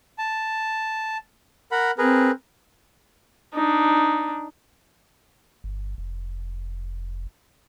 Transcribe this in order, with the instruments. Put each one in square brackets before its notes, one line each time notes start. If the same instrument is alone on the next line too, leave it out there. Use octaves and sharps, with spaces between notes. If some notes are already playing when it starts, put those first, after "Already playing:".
[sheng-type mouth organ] A5
A#4 F#5 B5
[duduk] C4 [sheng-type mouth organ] G#4 A#4 B4
[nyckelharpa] D4 D#4
[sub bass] G1
F1